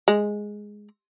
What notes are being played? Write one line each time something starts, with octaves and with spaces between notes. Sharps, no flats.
G#3